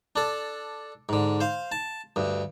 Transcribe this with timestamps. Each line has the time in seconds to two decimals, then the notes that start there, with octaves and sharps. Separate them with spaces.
0.16 D4 A4
1.09 G#2 D3
1.41 C5 F5
1.72 A5
2.16 D2 G2